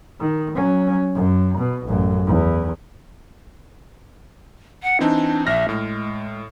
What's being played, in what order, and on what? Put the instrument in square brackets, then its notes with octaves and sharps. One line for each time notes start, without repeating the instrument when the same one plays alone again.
[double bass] D#3
F#3 C#4
F#2
B2
A1 F#2
E2
[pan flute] F#5
[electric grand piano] E3 C4 D#4 [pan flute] D4
[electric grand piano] A#1 F6 A#6 [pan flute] E5
[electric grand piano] A2 [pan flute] G#3